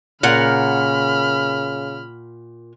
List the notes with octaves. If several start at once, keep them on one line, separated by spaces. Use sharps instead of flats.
A#2 C#3 A#4 F#5 B5 F6